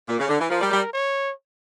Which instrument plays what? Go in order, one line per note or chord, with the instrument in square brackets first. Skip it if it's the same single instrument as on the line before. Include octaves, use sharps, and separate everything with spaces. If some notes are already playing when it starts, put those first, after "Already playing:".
[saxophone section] A#2
C#3
D3
E3
[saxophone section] F3 [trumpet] A#4
[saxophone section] G3
G3
[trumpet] C#5